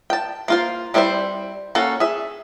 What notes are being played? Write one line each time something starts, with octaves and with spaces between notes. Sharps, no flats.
G5 A5
A#3 F4 C5
G3 C4 E4 G#4 C5
A#3 C#4 F#4 A4
G#4 E5